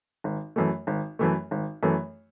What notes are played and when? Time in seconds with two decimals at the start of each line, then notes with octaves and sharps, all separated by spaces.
0.24 G#1
0.56 F#2 E3 A3
0.87 G#1
1.19 F#2 E3 A3
1.51 G#1
1.83 F#2 E3 A3